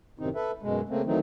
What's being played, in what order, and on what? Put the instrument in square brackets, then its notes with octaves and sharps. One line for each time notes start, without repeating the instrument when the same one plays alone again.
[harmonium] F#2 A2 C3 D#3 C4 D#4
A4 B4 E5
F#2 B2 G#3
C#3 A3 A#3 C4
D#3 E3 F#3 A3 C4 D#4